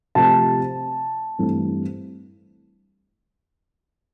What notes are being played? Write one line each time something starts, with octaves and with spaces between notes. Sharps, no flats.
C3 F3 A3 C4 A5
G2 E3 A3 C4